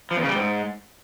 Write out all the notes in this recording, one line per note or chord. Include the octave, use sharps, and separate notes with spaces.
F3
E2
C#3
G3
G#2